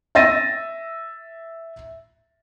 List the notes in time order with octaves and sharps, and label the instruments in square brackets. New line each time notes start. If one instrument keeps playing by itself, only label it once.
[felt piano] E5 E6 A6 A#6 D#7